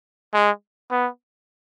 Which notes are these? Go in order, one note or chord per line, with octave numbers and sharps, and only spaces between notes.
G#3
B3